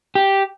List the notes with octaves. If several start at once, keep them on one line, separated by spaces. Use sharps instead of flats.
G4